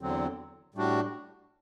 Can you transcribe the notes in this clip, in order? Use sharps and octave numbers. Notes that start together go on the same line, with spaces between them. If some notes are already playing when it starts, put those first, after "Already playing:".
E2 D3 F#3 C4
A2 G3 D4 F#4